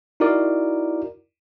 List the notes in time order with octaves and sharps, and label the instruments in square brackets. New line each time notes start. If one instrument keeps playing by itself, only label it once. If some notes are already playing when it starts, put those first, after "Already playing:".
[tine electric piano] D#4 E4 F#4 A#4 D5 D6